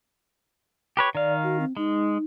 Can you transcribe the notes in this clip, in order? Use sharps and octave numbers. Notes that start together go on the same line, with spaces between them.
G4 B4 C#5
D#3 D5 F5
F#4
C4
G#3 D#4